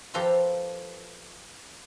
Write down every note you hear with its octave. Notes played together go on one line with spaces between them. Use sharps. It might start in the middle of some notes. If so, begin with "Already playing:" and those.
F3 G4 A4 B4 A#5 C6